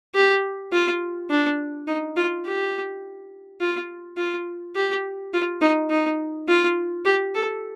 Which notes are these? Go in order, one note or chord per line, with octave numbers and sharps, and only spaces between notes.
G4
F4
D4
D#4
F4
G4
F4
F4
G4
F4
D#4
D#4
F4
G4
A4